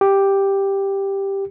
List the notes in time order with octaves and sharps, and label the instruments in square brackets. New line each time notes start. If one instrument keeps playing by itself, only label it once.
[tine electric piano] G4